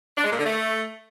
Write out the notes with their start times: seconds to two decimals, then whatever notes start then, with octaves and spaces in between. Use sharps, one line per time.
0.17 D4
0.24 G#3
0.31 A#2
0.38 D3
0.45 A3